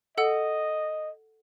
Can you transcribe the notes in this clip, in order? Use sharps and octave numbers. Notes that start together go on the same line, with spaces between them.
A4 D#5 F#5 E6